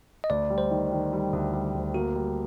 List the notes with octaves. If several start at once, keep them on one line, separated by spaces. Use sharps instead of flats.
D#5
D2 D5
G3
C5
D#3
D#3
G3
D2
G3
D2
A#3 F#4
G3